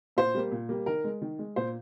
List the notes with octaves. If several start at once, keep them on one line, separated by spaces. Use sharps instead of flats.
A#2 C5
G3 A#3
A#2
G3 A#3
D#3 A#4
G#3
D#3
G#3
A#2 C5